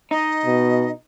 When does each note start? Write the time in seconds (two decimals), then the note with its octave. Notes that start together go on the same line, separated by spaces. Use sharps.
0.11 D#4 D#5
0.45 B2